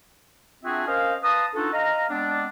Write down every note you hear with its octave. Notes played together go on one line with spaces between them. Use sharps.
C4 D4 F4 F#4 G#4 E5
C#4 A#4 C5 D#5 F5
B4 F5 A5 A#5 D#6
D4 D#4 F4 F#4 A4
D#5 F5 A#5
G#3 B3 C4 D4